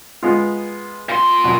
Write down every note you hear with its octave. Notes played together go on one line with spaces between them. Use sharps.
G#3 B3 F4
A#2 C6
B2 F#3